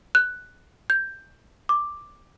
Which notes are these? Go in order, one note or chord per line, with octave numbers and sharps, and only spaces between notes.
F#6
G6
D6